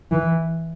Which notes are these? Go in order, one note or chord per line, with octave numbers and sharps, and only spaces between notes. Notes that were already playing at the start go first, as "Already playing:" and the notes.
E3